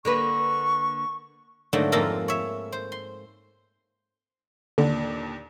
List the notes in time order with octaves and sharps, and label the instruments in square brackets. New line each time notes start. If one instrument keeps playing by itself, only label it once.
[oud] D3 A#3 B4 [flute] C#6
[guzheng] G#2 D3 F#3 A3 A#3
F2 G#2 A#3 F4 A4 A#5
C#5 E5
C5
C6
[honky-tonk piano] D#2 A#2 D4 [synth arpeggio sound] D3